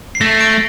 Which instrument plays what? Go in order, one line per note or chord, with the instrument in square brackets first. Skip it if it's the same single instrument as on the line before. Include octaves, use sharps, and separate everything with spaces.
[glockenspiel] C7
[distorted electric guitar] A3 [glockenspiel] A#6
[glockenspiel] D7